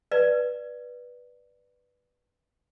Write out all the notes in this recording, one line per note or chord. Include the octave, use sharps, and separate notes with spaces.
B4 D5